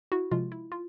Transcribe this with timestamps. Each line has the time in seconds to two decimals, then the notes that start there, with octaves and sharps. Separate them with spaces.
0.12 E4 F#4
0.31 C3 F3 G#3 F4
0.52 E4
0.72 F4